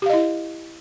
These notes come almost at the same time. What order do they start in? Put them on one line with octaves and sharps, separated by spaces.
G4 F5 D#5 E4